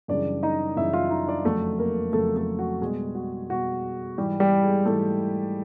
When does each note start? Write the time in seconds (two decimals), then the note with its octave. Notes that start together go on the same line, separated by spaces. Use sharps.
0.08 F#2 C#3 E3 G3 D4 D5
0.43 D#4 D#5
0.76 F#2 C#3 E3 G3 E4 E5
0.93 F4 F5
1.11 D#4 D#5
1.27 D4 D5
1.45 F2 C#3 F#3 A3 A4
1.79 A#3 A#4
2.13 F2 C#3 F#3 A3 A4
2.36 A3 A4
2.59 F#4
2.81 B2 G3 G#3 G#4
3.15 F#4
3.50 B2 G3 F#4
4.18 G#2 E3 G3 G4
4.40 G3 G4
4.64 G#3 G#4
4.85 G#2 E3 G3 A3 A4